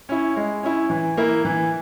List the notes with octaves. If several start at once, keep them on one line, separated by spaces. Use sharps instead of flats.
C#4 E4
G#3
C#4 E4
E3
A#3 E4
E3